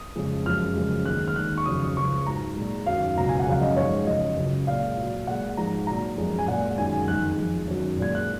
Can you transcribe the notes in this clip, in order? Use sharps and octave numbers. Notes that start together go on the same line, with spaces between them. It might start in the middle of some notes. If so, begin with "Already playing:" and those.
Already playing: D#6
F2 C#3 F3 G#3
F#2 F3 G#3 F6
F#2 C#3 F3 G#3
D#2 D#3 G#3 F#6
F6
D#2 D#3 G#3 F#6
C#6
F2 C#3 F#3 D#6
C#2 C#3 F3 G#3 C#6
G#2 F#3 A#5
A#2 G#3
F#2 D#3 F#3 F5
C#2 B2 F#3 A#5
G#5
F#5
F#2 C#3 F3 G#3 F5
D#5
G#2 F3 G#3 C#5
F#2 C#3 F3 D#5
C#2 C#3 F#3
A#2 G#3 F5
A#2 F#3
A#2 G#3 F#5
G#2 F3 G#3 A#5
A#2 F#3 A#5
F#2 F3 G#3
G#5
A#2 G#3 F#5
F#2 D#3 G#3 G#5
F2 D#3 G#3 F#6
F2 F3 G#3
F#2 D#3 F#3
A#2 G#3 G#6
F#6